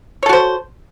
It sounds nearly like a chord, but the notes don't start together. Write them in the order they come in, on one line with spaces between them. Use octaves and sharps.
C#5 A4 F#4 C5